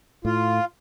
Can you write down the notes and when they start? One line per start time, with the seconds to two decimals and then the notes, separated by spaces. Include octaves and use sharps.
0.25 A2 F4